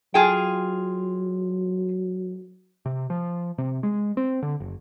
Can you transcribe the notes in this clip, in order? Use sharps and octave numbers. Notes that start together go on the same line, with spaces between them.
F#3 F4 G#4 G5
C3
F3
C3
G#3
C4
D3
F#1